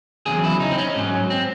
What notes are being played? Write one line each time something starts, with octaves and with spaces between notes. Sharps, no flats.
E2 C#3 F#3 G#4
E4
D#4
C4
C#4
G#2 F#3
C4